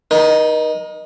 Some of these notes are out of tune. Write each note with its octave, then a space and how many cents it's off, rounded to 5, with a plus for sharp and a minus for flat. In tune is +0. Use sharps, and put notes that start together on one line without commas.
D#4 -5 A#4 +40